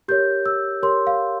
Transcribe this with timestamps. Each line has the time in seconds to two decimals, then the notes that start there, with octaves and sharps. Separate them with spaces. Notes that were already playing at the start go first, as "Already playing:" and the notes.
0.08 G4 A#4 C#5 G6
0.46 E6
0.82 G4 A#4 C#5 C6
1.07 F5